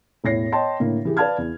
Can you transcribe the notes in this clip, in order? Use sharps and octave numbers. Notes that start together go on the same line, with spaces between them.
E1 A2 C#5 A#6 C7
C#5 D#5 G5 A5 C6
A2 D3 A#3
E3 G4 G#4
B4 D5 F5 A5 F6 G#6
E2